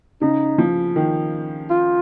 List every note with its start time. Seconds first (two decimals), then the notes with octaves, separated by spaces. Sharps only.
0.21 C#3 D#4
0.58 F3
0.96 D#3
1.70 F4